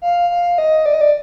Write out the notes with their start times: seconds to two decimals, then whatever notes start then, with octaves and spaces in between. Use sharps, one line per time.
0.02 F5
0.30 F5
0.58 D#5
0.86 D5
0.94 D#5
1.01 D5